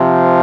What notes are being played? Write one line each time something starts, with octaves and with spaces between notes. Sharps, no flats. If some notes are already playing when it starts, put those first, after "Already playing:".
Already playing: C3 F3